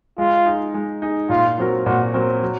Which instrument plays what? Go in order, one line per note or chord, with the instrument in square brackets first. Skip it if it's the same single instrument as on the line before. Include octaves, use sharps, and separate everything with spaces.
[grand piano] G#3 [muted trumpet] F4
[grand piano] D#4 G#4
G#3
D#4 G#4
[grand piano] A#2 [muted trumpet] F4
[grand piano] F#3 C4 F#4 A#4
[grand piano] A#2 [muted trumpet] F#4
[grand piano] F#3 C4 F#4 A#4
F#3